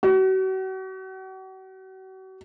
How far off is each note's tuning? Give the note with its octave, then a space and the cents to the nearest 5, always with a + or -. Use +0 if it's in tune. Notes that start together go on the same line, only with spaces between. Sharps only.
F#4 +40